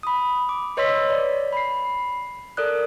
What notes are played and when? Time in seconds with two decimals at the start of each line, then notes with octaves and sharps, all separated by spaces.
0.03 B5 D#6
0.49 D6
0.77 B4 C#5 D#5 C6 E6 B6
1.10 D5
1.53 B5 C7
2.57 A4 A#4 D5 D#6 F#6